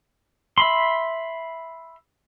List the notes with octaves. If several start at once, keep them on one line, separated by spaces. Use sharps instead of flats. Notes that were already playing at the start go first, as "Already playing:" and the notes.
E5 B5 C6